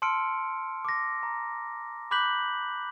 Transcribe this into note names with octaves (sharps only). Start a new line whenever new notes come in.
A5 C6 E6 F6 C#7 D7
D6 A#6
A#5
B5 D6 F#6 G6 B6 F#7